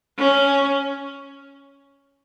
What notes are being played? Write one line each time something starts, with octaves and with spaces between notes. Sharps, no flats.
C#4